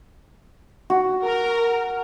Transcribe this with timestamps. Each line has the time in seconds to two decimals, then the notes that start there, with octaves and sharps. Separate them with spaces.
0.90 F#4
1.23 A#4